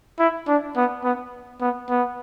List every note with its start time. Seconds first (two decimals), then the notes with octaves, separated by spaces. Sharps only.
0.19 E4
0.48 D4
0.77 B3
1.04 B3
1.61 B3
1.90 B3